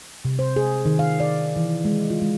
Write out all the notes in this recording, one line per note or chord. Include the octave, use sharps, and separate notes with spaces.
C3
C5
G#4
D#3
F5
D5
E3
G#3
F4
G#3